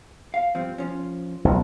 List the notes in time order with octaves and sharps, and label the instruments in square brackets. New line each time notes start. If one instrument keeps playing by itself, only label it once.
[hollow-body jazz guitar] F5
G2 F3 C4
F3 C#4
[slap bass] B1